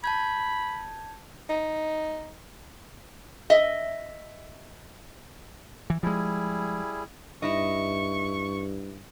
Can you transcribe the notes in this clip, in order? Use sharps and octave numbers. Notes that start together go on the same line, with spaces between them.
A5 B5 G6 G#6
D#4
D#5 E5
E3
F3 G3 G#3 E4 G#4
G2 D#4 E4 D#5 C#6